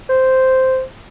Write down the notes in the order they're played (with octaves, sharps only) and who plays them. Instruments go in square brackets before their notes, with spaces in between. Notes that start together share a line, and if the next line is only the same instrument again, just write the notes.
[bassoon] C5